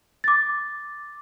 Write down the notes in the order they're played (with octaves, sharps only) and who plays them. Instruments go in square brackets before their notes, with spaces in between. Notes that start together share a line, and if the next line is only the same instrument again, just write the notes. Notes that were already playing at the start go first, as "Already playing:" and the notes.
[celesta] D6 A6